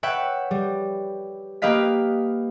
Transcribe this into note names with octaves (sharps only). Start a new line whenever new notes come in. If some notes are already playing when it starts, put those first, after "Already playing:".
B4 C#5 E5 F#5 G5
G3
A#3 G4 B4 D#5 F5 B6